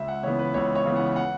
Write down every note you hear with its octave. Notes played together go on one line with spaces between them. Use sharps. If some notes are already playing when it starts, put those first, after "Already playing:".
Already playing: C#2 E5
F#5
C#3 E3 B3 C#5
B4
C#2 C#5
C#5
C#3 E3 B3
F#5
F#5